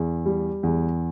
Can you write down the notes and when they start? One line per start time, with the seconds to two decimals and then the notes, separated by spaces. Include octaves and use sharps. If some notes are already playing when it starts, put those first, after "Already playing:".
Already playing: E2
0.26 G3
0.63 E2